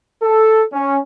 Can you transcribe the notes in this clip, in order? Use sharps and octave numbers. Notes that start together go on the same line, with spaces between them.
A4
C#4